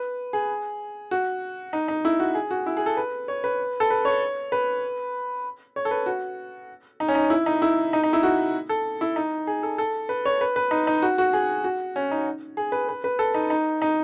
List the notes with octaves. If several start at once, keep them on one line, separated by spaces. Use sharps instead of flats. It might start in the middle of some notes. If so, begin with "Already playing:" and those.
Already playing: B4
G#4
F#4
D#4
D#4
E4
F#4
G#4
F#4
E4
G#4
A4
B4
C#5
B4
A4
B4
C#5
B4
C#5
A4
B4
F#4
D#4
C#4
D#4
E4
D#4
E4
D#4
D#4
E4
F#4
A4
E4
D#4
G#4
A4
A4
B4
C#5
B4
B4
D#4
D#4
F#4
F#4
G#4
F#4
C#4
D#4
G#4
B4
B4
B4
A4
D#4
D#4
D#4